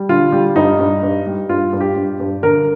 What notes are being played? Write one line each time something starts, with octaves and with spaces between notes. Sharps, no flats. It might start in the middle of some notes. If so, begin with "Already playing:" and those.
Already playing: G3
D3 F4
G3
G2 D#4
G2
G2
G3
G2 F4
G2
G4
G2
G2
D3 A#4